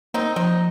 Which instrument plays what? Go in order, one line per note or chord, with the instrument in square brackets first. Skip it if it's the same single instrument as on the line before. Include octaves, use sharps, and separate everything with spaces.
[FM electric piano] A#3 [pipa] C4 D#4
[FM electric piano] F3 [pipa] C4 D#4